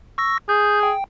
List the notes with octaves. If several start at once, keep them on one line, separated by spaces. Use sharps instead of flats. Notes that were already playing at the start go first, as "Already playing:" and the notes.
C#6 E6 A#6
G#4 G6
G5